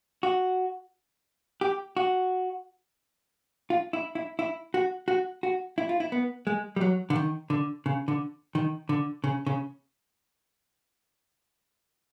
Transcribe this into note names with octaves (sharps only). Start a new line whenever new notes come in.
F#4
G4
F#4
F4
E4
E4
E4
F#4
F#4
F#4
E4
F4
E4
B3
G#3
G3
F#3
D3
D#3
D3
C#3
D3
D#3
D3
C#3
C#3